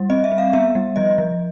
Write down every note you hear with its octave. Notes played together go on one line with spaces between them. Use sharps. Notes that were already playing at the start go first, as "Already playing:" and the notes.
Already playing: G3
C4 D#5
E5
C4
F5
B3 E5
G3
F3 D#5
F3